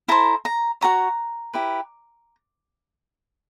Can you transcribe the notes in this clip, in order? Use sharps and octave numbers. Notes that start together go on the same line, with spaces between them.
E4 A4 C5 A#5
A#5
F#4 A4 C#5 A#5
E4 G4 B4